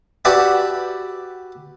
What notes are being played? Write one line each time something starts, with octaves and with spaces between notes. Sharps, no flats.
F#4 G4 B4 D5 E5 A5